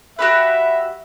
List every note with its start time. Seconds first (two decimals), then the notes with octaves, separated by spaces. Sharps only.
0.19 F#4 G4 B4 E5